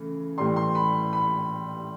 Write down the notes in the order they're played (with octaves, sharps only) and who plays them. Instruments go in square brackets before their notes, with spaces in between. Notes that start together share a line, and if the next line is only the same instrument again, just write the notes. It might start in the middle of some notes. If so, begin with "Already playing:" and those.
Already playing: [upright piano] C#3 E3 A3
A2 E3 G3 C6
C6
B5
B5